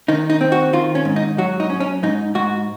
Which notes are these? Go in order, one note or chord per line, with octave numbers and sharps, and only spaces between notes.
D#3 D#4
D#4
C4
F#4
D#3 F4
C#4
G#2
D#4
F#3 F#4
D#4
C#4
C#4
G#2 D#4
G#2 F#4